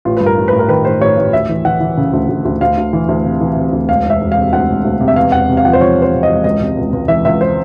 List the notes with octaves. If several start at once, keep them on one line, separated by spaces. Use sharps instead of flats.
A1 F4
G2 B4
A#4
A1
A1 B4
A#4
D#3 B4
A1 C5
A1 C#5
A1
D2 E5
E3
E3 F#5
E3
C#3
D2
D2
D2
D2 F5
D2
E3
D2
C3
E3
C3
D2
E1 F5
E1
E5
E1
F5
C3
D2 F#5
E1
D2
C3
E5
E2 F5
E1 F#5
C3
F5
F3 F#5
C5
F3 C#5
C3
C5
C3
D#5
E1
C#2 D#5
C3
C#2
C#2
E3 E5
C#2 E5
C5